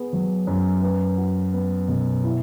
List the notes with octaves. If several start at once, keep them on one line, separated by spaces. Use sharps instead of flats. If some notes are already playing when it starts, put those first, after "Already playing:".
Already playing: B3 G#4
F#3
F#2
B4
F#4
B3
B2
E4